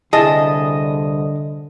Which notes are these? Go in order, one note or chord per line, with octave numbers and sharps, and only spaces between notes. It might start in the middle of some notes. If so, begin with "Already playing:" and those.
C2 D3 E4 G#4 D#5 A5